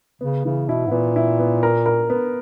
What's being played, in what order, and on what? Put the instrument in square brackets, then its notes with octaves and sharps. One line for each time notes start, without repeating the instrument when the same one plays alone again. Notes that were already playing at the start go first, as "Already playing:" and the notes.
[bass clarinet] C#3 [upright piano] B3
[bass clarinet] C#3 [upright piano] E3
[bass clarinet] B2 [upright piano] E4
[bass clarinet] G#2
[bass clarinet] A#2 [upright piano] B3
[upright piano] E4
B3
A#4
A#4
B3